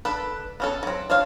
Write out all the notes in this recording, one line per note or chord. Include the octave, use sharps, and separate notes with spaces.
D4 A4 B4
B3 C#4 A4
F#3 C4
D4 C5 C#5 F5